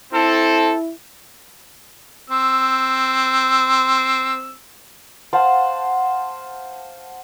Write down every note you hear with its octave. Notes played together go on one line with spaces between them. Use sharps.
C4 E4 A4
C4 E6
C5 F5 F#5 A5